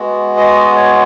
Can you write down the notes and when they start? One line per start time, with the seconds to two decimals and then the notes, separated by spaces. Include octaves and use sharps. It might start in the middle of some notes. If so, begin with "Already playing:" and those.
Already playing: G#3 B3 F#4
0.37 D#5
0.76 C#5